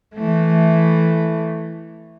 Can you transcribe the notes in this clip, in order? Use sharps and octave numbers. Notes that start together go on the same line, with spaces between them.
E3 A3